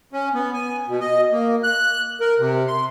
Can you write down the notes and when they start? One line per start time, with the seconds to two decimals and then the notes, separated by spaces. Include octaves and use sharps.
0.13 C#4
0.34 B3
0.54 G#5
0.88 B2
1.00 D#5
1.32 A#3
1.63 F#6
2.21 A#4
2.39 C3
2.67 C6